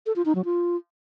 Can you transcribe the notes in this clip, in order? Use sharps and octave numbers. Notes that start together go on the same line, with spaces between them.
A4
F4
D#4
F#3
F4